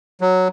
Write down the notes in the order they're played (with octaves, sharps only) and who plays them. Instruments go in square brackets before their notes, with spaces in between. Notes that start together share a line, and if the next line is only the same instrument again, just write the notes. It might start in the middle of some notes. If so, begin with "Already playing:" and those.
[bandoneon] F#3